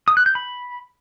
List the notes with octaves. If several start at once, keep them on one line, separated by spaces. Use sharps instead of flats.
D#6
F#6
G6
B5